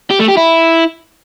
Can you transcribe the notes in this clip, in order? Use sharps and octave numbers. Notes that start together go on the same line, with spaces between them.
G4
A3
G4
E4